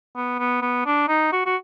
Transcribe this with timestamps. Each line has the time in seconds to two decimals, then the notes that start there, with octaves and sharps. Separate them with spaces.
0.16 B3
0.39 B3
0.62 B3
0.86 D4
1.08 D#4
1.33 F#4
1.46 F#4